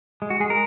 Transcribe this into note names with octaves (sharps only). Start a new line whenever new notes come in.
G#3
F#4
G#3 G#4
A#4